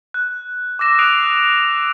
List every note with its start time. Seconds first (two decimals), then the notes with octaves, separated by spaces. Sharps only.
0.14 F#6
0.79 D6 E6 A#6 E7
0.98 D#6 F#6 C7 D7 D#7 F7